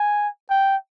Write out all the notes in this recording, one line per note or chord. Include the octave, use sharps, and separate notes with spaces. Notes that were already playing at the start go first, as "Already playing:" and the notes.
Already playing: G#5
G5